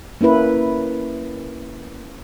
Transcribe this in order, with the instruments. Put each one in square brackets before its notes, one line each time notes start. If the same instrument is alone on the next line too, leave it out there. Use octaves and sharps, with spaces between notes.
[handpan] A#3 C#4 E4 B4